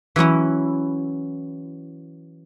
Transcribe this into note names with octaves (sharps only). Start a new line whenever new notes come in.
E3 F#3 C#4 E4